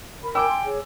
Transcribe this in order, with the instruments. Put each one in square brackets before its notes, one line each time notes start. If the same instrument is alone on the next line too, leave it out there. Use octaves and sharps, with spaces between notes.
[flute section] A#4 B5
[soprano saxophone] G5 [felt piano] G#5 D6 E6
[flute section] C6
G#4 C#5